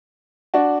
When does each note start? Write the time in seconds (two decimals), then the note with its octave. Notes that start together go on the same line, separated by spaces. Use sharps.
0.54 D4 F#4